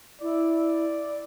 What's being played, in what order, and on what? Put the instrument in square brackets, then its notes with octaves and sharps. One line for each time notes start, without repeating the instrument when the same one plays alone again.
[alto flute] E4 [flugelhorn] D5